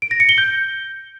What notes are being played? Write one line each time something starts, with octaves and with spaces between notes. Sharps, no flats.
D7
A#6
C#7
G7
G6